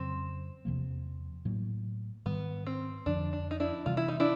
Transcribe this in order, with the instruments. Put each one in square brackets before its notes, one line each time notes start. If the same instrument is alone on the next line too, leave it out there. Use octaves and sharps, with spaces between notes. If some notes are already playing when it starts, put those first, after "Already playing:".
Already playing: [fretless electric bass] F2 C#3 F#3 [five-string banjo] C4
[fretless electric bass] E2 C3 F3 A#3
A2 F#3 A#3
[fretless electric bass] G#2 D#3 G3 [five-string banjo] B3
[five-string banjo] C4
[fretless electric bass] F2 D3 F3 [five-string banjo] D4
[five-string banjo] D4
D#4
D4 E4
[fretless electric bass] C3 E3 G3 B3 [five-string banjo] F4
[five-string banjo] E4
D#4
D4 E4